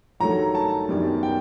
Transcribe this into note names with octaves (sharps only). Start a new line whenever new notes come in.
G2 D#3 F#3 A3 A#5
A5
F#2 D#3 G3 B3 D4
G5